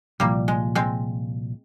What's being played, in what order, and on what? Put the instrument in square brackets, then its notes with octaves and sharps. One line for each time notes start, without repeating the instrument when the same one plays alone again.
[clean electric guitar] C2 A#2 F3 [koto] G3 A#3
[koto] G#3
G#3 C4